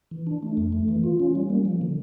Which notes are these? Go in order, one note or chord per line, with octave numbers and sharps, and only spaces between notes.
E3
D4
A3
F2
A3
E3
F4
C#4
G3
A#3
F3
D3